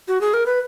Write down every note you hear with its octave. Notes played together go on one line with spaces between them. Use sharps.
F#4
G#4
A#4
B4